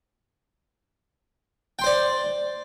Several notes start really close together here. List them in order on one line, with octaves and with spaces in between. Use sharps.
G5 C6 C5 D5